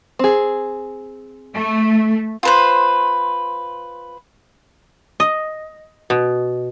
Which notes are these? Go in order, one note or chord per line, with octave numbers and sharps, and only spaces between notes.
C4 G#4
A3
F4 B4 C5
D#5
B2